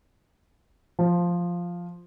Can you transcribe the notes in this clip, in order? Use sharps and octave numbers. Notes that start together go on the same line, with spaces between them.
F3